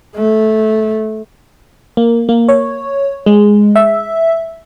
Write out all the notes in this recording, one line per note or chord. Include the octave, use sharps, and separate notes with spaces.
A3
A#3
A#3
C#5
G#3
E5